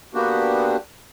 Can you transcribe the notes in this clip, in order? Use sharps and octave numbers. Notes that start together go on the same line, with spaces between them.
D3 A#3 B3 D4 F#4 G4